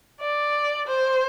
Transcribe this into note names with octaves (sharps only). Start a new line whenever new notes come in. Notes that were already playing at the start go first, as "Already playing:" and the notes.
D5
C5